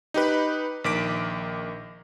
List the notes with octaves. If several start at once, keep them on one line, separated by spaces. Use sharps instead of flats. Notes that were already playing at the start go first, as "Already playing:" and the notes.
D#4 G4 B4
A#1 D#3 D6 B6 D7